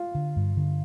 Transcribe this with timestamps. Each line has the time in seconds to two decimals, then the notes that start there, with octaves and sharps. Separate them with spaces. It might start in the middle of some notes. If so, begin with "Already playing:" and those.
Already playing: F4
0.15 D3
0.36 G2
0.57 D3